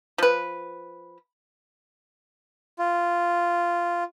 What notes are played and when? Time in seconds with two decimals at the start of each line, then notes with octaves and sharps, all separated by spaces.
0.18 F3 B4
2.79 F4